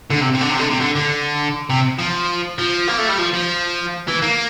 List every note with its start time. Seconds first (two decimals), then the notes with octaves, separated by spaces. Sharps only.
0.10 D3
0.20 C3
0.34 C3
0.41 D3
0.50 C3
0.60 D3
0.71 C3
0.80 D3
0.96 D3
1.70 C3
1.99 F3
2.58 F3
2.88 A#3
2.98 A3
3.08 G3
3.18 F3
3.33 F3
4.08 E3
4.22 A#3